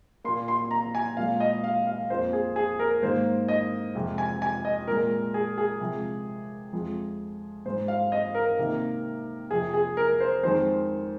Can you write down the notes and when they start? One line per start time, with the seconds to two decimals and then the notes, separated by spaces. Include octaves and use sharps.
0.24 A#2 A#3 C6
0.48 C6
0.71 A#5
0.95 G#5
1.17 A#2 G#3 F5
1.40 D#5
1.64 F5
1.87 F5
2.10 F2 F3 A#3 C5
2.33 G#4
2.56 G#4
2.79 A#4
3.02 G#2 D#3 A#3 C5
3.48 D#5
3.95 F2 C3 G#3
4.18 G#5
4.42 G#5
4.65 D#5
4.87 A#2 G#3 A#4
5.34 G#4
5.58 G#4
5.80 C3 F3 G#3
6.73 F2 F3 G#3
7.66 G#2 G#3 C5
7.88 F5
8.12 D#5
8.35 A#4
8.58 C3 D#3 A#3
9.50 F2 C3 F3 G#4
9.74 G#4
9.97 A#4
10.20 C5
10.43 F2 D#3 G#3 C5